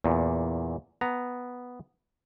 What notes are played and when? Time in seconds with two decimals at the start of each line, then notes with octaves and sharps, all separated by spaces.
0.04 E2 A#2
1.01 B3 A#5